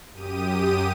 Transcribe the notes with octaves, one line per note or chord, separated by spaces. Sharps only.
F#2 G4 D#6 D#7